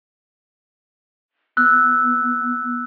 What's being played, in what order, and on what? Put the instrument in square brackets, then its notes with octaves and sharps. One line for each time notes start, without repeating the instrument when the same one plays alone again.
[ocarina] B3 [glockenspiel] E6 F#6